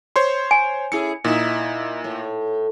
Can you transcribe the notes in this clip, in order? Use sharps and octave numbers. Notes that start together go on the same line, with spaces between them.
C5 C#5 C6
G#5
C#4 E4 G#4 C#7
A#2 D#4 E4
A2